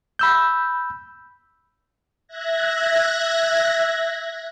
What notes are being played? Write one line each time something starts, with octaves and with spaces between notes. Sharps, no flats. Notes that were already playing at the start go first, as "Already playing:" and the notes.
B5 E6 G6
E5 F#6 G#6 A#6